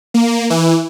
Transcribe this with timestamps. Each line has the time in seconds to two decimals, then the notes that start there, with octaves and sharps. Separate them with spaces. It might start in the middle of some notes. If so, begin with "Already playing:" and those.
0.14 A#3
0.50 E3